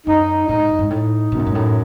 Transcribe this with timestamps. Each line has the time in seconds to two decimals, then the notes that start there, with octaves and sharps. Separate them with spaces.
0.07 F#2 D#4
0.49 A2 D#4
0.59 G#2
0.69 F#2
0.79 G#2
0.90 A2 D#4
1.32 F#2 B2
1.39 A2
1.47 G#2
1.55 A2